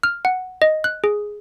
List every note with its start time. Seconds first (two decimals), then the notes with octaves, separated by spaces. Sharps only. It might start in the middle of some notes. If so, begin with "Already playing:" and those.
0.03 F6
0.25 F#5
0.62 D#5
0.84 F#6
1.04 G#4